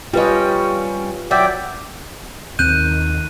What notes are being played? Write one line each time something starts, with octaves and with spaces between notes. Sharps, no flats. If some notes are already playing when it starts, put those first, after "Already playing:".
G3 C#4 F4 B4 D#5
F#3 D5 E5 G5
D#2 D#3 C4 F#6 G6 D#7